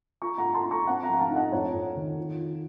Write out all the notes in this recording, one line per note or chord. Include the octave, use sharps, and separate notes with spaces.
F4 A#5 C#6
F#5 A#5
F4
A5 C6
F4
A#5 C#6
C4 F#5 A#5
F#5 A#5
F3
F#5
F5 A5
D#4
D#5 F#5
F2 C#5
F2
D#3
F4
F4